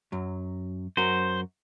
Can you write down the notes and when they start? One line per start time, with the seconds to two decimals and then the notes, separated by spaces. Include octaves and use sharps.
0.12 F#2 F#3
0.97 F#2 F#4 A#4 C5